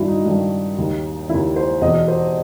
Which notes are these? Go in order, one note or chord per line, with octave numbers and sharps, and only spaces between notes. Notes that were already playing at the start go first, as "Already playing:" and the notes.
Already playing: G2 D#3 E4 F#4
D#4
G2 D#3
D#2 D#3
D#2 D#3 E4
C5
E2 B2 D#5
C5